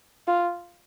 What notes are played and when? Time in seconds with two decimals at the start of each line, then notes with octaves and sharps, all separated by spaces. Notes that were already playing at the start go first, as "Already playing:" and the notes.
0.28 F4